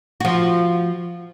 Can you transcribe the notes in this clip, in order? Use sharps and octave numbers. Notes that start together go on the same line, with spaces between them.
F3 F#4